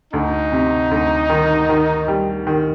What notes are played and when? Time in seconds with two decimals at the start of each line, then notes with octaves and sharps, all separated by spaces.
0.13 D2 D#4
0.52 C3
0.91 D2
1.29 D#3
1.69 D#3
2.08 G3
2.47 D#3